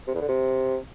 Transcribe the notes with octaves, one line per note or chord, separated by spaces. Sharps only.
C3
E2
D3
C3